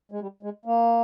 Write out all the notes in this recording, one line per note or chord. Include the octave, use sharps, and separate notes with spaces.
G#3
G3
G#3
A#3